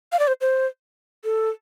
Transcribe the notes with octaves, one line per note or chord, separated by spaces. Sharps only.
F5
D5
C5
C5
A4